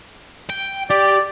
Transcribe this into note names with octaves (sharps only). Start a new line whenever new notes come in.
G5
G4 D5